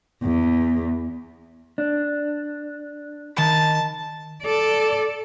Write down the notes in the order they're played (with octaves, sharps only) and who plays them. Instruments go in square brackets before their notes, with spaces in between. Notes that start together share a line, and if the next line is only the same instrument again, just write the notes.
[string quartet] E2
[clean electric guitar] D4
[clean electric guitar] D#3 B5 [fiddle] A5
[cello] A4 D5